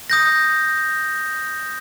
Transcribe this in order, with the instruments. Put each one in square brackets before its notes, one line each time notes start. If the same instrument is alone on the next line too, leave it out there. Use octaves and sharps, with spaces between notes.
[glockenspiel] D#6 G6 A#6